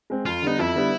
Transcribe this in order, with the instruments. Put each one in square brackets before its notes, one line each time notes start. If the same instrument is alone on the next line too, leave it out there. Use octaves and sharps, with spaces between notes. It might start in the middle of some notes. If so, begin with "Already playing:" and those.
[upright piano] G#3 C4
[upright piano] F2 [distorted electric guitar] F4
[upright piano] D3 G3 B3 [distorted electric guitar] D#4
[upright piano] F2 [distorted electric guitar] E4
[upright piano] D3 G3 B3